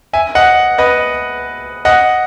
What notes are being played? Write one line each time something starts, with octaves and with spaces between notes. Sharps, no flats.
E5 G#5
D#5 F#5
B4 D#5
D#5 F#5